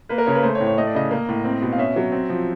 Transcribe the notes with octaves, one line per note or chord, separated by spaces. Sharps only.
A#3 B4
A#4
C#3 C#5
B4
A3 C5
C#5
A2
C#5
A3 D#5
D5
C#3 D#5
A#3
A2
C4
B2
F5
C#4 E5
F#3
C4
F3